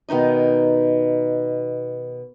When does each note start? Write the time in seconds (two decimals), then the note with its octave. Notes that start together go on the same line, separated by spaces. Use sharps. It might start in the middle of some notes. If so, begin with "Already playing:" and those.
0.09 B2 D#3 D#4 D#5